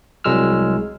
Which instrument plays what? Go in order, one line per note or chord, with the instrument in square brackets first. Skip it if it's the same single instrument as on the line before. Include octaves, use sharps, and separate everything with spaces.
[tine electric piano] C2 F#3 G#3 E6 F6